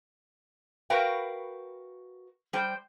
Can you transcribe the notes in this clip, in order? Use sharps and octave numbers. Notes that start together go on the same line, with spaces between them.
F#4 A#4 B4 F5 G5
G3 C5 G5